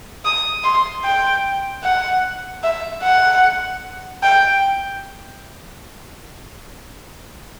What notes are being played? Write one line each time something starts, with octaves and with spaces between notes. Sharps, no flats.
D#6
C6
G5
F#5
E5
F#5
G5